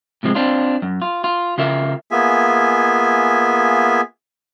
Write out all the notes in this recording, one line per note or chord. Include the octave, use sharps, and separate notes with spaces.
A2 C3 F3 G3 G#3
C4 D4 F4
F#2
F4
F4
C#3 F4 A#4 E5
A#3 B3 F4 G#4 E5 G#5